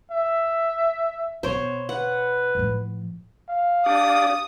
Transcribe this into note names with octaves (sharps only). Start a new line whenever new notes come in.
E5
B2 B3 C4 C5 C#5
B4 F#5
A2 F3
F5
D4 G4 D5 D#6